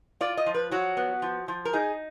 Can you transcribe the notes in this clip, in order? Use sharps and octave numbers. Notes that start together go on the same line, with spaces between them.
F4 D5
D#5
F3
B4
F#3 F#4
B3
F3
F3
A#4
D#4 G#4